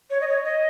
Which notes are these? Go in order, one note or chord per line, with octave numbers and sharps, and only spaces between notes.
C#5
D#5
C#5
D#5